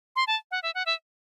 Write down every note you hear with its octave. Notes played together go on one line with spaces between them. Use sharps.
C6
A5
F#5
E5
F#5
E5